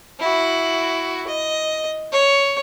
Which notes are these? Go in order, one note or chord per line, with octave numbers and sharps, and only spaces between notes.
E4 F#4
D#5
C#5